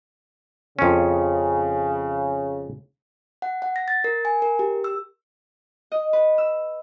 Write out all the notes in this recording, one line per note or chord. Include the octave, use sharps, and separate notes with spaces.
F2 C#3 C#4
F#5
F#5
A#6
A6
A#4
G#5
A#4
G4
E6
D#5
B4
E6